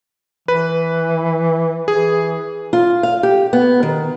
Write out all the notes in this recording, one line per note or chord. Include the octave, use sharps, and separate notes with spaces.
E3 B4
E3 G#4
F4
F5
G4
B3
D#3